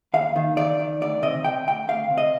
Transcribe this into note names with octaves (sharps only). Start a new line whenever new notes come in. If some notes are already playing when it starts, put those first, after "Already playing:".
D#2 F5
D#3
D#3 D5
D#3
D2 D5
C3 D#5
C3 G5
D2 G5
D2 F5
C3
D#5